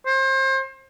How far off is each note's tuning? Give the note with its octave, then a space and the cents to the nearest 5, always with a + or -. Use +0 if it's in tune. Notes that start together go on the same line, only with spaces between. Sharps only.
C5 +30